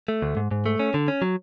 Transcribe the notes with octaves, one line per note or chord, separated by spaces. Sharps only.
A3
D2
G#2
G#2
A3
C#4
D3
C#4
F#3